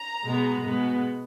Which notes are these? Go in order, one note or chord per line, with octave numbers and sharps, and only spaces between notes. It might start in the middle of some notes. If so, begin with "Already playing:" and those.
Already playing: A#5
B2 G#3 B3
B2 G#3 B3